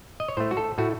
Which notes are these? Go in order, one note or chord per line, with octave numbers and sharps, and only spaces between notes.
D#5
C#5
A2 A3 C5
F#4
A4
A2 A3 F#4